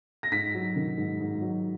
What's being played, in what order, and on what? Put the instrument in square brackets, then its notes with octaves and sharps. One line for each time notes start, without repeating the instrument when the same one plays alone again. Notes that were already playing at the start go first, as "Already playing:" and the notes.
[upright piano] A#6
G#2 B6
F#3
D#3
G#2
G#2
F#3